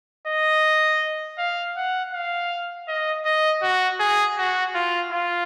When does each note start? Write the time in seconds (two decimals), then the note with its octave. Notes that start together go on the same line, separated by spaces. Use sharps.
0.27 D#5
1.38 F5
1.77 F#5
2.13 F5
2.88 D#5
3.25 D#5
3.62 F#4
4.00 G#4
4.38 F#4
4.75 F4
5.12 F4